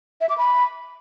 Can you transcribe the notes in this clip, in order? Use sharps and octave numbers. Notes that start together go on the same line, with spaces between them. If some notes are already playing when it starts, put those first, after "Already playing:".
E5
D6
B5